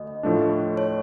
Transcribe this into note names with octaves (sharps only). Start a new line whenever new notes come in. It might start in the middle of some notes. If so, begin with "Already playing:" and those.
Already playing: D2 D#5
A2 F3 A3 D4
C#5